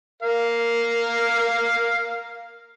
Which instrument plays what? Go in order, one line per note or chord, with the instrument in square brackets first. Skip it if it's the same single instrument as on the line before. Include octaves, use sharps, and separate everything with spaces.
[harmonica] A#4 F5